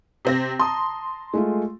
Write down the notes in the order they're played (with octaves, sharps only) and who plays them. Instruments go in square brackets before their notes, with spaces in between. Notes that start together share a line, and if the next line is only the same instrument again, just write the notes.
[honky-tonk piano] C3 C4 A#6
[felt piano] A5 A#5 D#6 [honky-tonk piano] C6
[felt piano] G#3 A3 F4